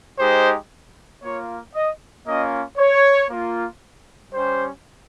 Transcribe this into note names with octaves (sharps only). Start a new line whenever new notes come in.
G#3 D#4 G4 C5
A#3 F4 C#5
D#5
A#3 C#4 F4 D#5
C#5
A#3 F4
G3 C#4 G4 C5